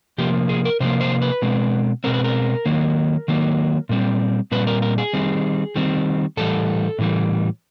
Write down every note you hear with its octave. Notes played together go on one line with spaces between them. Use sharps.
C3 F3 A#3 G4
G#4
A#4
C3 F3 A#3 C5
C5
B4
B2 G#3 C4
B2 G#3 C4 A#4
B4
A#4
D#3 F#3 A#3
D#3 F#3 A#3
A#2 G3 C4
A#2 G3 C4 B4
A#4
A#4
G#4
D#3 G3 C4
D#3 G3 C4
A2 E3 G3 A4
A2 E3 G3